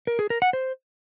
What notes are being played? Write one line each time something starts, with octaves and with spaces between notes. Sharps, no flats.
A#4
G#4
A#4
F#5
C5